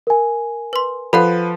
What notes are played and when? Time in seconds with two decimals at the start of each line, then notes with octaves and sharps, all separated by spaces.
0.07 A#4 G#5
0.73 B4 C6
1.13 F3 A4 B4 F5 F#5